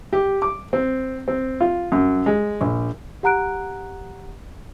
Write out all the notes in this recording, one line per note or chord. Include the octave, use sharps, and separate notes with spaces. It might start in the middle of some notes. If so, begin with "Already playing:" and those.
G4
D6
C4
C4
F4
F#2
G#3
A#1
G4 F#5 A#5 F#6 D7